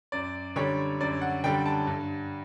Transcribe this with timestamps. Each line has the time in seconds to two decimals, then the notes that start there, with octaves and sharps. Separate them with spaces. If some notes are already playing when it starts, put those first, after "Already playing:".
0.12 F#2 D5
0.56 D3 G3 C#5
1.00 F#2 D5
1.21 F#5
1.44 D3 G3 G5
1.66 A5
1.87 G2